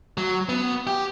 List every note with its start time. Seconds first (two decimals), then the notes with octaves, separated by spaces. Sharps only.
0.18 F#3
0.49 B3
0.87 G4